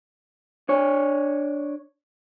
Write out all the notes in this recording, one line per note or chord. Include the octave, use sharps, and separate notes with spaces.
D4 C#5